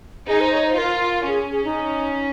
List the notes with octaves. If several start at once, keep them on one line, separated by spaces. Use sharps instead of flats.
D#4 G#4
C5
C#5
C5
F4 A#4
C#4 G#4
G#4
D#4